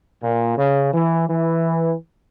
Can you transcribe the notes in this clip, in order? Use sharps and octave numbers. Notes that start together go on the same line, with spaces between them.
A#2
C#3
E3
E3